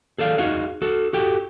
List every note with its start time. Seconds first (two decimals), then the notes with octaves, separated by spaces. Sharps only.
0.18 G#4 A4 D5 F5
0.38 D#4 F#4 G#4 F5
0.82 F#4 A4
1.13 F#4 G4 A4 G5